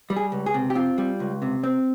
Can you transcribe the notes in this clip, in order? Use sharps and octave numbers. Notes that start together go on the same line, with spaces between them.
G3
G#4
C#2
G#4
C3
G4
C4 F4
G3
C#2
C3
C4